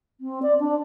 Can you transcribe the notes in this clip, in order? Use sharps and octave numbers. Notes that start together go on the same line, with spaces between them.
C4
D5
D4